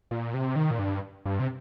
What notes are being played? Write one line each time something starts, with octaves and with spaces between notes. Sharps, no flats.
A#2
C3
D#3
A#2
G2
G2
C3